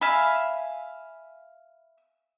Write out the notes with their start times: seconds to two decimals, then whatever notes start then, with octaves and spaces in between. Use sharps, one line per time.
0.01 E5 F5 G#5 B5